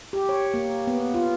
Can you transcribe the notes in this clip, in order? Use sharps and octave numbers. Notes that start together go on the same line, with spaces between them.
G4
C#5
A#3
B3
F4